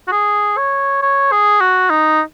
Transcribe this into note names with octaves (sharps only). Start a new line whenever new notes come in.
F#4
G#4
C#5
C#5
G#4
F#4
D#4